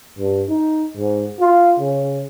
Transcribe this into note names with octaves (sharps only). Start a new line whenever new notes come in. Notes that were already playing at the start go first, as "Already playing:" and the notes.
G2
D#4
G#2
F4
C#3